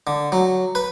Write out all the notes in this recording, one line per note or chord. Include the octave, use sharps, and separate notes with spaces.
D3
F#3
B4